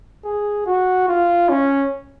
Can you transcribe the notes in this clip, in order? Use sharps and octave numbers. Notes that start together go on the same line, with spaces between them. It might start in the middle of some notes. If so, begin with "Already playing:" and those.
G#4
F#4
F4
C#4